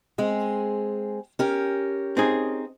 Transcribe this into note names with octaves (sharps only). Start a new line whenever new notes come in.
G#3 C4 G#4
C#4 G4 A#4
C4 D#4 G#4